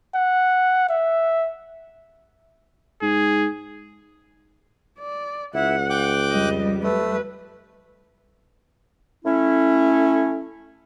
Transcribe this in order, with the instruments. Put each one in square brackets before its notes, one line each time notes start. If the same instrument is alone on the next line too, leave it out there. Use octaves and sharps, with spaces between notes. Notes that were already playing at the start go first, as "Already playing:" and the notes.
[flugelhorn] F#5
E5
[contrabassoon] G#2 [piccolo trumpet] G#4
[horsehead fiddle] D5
[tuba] C#2 [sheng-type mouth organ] E4 [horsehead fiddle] F#5
[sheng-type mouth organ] G5 D6 F#6
[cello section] F2 G3 [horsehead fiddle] D#5
[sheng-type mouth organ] A3 [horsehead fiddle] B4
[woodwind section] A3 C#4 E4